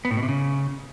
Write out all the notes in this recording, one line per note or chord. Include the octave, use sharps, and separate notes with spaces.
B3
A2
B2
C3
C#3